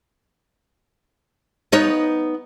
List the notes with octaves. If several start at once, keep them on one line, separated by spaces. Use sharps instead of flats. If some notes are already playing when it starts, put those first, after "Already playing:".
B3 D#4 C#5